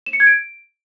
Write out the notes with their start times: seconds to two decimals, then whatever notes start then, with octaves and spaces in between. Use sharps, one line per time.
0.06 E7
0.13 C#7
0.20 G#6
0.27 D7